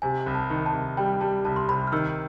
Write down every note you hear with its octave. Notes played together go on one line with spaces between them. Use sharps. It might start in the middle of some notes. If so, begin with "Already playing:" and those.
C3 G#5
C2
A5
D#3
A5
C2
G3 G5
G3 A5
C2 A5
C6
C3 B5
F6
D#3 E6